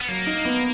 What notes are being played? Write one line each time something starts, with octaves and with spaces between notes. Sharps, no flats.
B3
F#3 A#3
D#4
B3